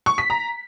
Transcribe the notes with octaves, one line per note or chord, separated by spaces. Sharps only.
C#6
B6
A#5